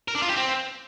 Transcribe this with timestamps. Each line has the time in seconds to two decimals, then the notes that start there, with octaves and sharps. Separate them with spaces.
0.08 A#4
0.15 D4
0.22 F4
0.29 G4
0.36 C4